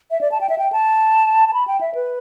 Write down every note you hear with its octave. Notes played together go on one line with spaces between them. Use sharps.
E5
D5
A5
G5
E5
G5
A5
A5
B5
G5
E5
B4